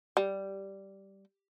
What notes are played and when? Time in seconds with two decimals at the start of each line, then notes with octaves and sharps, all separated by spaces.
0.17 G3